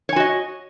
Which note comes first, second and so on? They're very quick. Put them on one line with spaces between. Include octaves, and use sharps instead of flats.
C#5 G#5 F#4 D#5